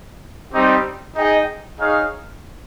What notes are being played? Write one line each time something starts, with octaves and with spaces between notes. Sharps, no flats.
G3 C4 D#4 G4
D#4 G#4 D#5 G5
D#4 G#4 C#5 F5